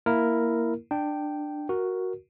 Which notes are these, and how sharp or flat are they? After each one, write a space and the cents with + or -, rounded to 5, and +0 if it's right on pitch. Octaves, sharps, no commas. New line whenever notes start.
A#3 +0 E4 +0 A#4 +0
D4 +15 G5 -5
F#4 +0 A#4 +5